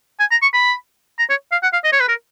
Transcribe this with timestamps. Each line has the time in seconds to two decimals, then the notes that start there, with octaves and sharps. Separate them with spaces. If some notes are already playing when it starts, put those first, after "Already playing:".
0.20 G#5
0.31 A#5
0.42 C#6
0.53 B5
1.19 A#5
1.30 C#5
1.52 F5
1.63 F#5
1.73 F5
1.84 D#5
1.92 C#5
2.00 B4
2.08 A#4